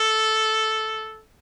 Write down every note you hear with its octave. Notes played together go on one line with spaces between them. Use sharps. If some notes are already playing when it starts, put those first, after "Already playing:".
Already playing: A4